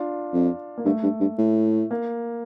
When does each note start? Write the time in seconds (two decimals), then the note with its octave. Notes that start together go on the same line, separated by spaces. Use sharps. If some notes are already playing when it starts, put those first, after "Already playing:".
Already playing: D4 F4
0.33 F2
0.78 A#3
0.85 G2 A3
1.03 G2
1.20 G2
1.38 A2
1.91 A#3